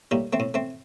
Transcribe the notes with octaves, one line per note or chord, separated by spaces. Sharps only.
A2 G3 A#3
A3 C4
A2
A3 C4